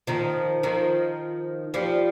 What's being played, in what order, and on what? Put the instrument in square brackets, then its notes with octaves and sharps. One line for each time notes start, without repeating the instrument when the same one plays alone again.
[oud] D#3 F3
D#3 F3
F3 G3